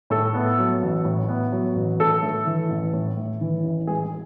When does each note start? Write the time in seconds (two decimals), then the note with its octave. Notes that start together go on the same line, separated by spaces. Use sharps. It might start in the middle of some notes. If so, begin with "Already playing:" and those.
0.10 A2 A4
0.34 B3
0.59 F#3
0.82 A1
1.05 A2
1.29 B3
1.52 F#3
1.75 A1
2.00 A2 A4
2.22 A3
2.46 E3
2.71 A1
2.93 A2
3.17 A3
3.41 E3
3.65 A1
3.87 G#3 G#4